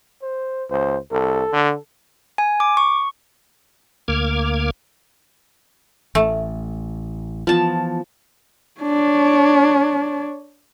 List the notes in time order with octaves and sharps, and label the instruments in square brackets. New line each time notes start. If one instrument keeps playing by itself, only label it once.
[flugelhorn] C5
[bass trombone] C#2 [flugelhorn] C5
[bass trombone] C2 [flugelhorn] A4
[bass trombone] D3
[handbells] G#5
D6
C#6
[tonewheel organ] D2 A#3 D6 F6 G#6
[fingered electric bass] A1 [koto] A3
[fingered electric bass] E3 B3 [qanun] F3 A5
[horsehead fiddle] D4 C#5